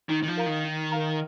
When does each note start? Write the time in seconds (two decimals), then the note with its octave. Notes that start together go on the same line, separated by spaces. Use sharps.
0.09 D#3 D#4
0.23 D#3
0.28 F3
0.37 A#4 F5 A#5
0.46 D#3
0.64 D#4
0.92 A#4 F5 A#5